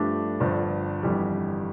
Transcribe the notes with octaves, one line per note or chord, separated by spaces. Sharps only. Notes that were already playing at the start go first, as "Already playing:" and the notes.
Already playing: G2 F3 A3 D4 G4
G1 G2 F3
G1 F2 E3 G3